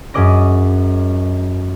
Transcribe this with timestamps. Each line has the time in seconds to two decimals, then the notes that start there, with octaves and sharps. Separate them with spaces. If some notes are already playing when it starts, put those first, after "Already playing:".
0.14 F#2 C#4 G#4 D#5 D6 A#6